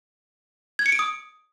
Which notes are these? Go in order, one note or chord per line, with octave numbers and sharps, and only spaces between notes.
G#6
C#7
D7
D#6